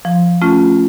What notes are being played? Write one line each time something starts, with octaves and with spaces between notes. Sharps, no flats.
F3
A3 C#4 F4